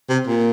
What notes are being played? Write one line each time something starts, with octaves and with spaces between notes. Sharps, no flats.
C3
A#2